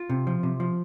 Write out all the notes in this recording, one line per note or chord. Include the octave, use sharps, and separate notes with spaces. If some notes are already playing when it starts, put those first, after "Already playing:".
Already playing: F4
C3
F3
C3
F3